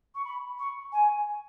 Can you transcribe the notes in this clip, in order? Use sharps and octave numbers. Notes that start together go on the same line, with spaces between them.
C#6
B5
C#6
G#5